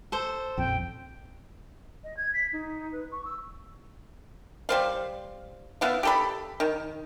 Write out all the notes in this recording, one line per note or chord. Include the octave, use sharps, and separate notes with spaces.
A4 C5
A#1 F2 G5
D#5
G#6
B6
D#4
B4
C#6
E6
G3 C5 F5
B3 E4 F5
G4 A4 B5
D#3